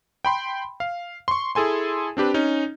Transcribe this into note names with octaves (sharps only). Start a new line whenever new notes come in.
G5 B5 C6
F5
C6 C#6
E4 G#4 A4 G#5 C6
C4 D4 G4 B4
C#4 D#4